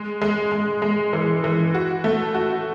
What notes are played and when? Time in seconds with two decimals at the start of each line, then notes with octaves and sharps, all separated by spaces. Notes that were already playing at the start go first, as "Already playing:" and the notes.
Already playing: G#3
0.22 G#3
0.52 G#3
0.82 G#3
1.13 E3
1.44 E3
1.75 F#4
2.04 A3
2.35 F#4